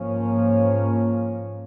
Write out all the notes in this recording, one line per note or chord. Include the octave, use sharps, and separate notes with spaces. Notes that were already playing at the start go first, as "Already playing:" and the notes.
Already playing: G#2 F3 A#3 C#4